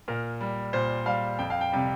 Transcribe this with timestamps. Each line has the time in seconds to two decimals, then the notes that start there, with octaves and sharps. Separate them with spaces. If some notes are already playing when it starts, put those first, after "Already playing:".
0.08 A#2 A#4
0.41 G3
0.73 A#2 C5
1.06 G3 F5
1.39 F2 G5
1.50 F5
1.61 G5
1.72 C3 G3